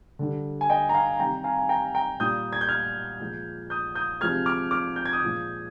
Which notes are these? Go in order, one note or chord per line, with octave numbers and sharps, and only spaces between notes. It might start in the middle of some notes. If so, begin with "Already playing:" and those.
D3 G3
G#5
D#5 G5
A#5
F5 G#5
C3 D#3 G3 G5 A#5
F5 G#5
G#5
G5 A#5
G5 A#5
A#2 G3 D#6 G6
G#6
G6
F6 G#6
A#2 F3 G#3
D#6 G6
D#6 G6
C3 F3 G#3 F6 G#6
D6 F6
D6 F6
G6
G#6
D#6 G6
A#2 F3 G#3